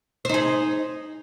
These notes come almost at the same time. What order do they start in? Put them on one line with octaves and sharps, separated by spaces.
C5 D#4 G#4